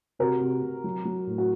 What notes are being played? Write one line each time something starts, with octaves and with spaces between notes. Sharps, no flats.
C3 F#4 A#4
C3
C3
F#3
F#3
A2
F#4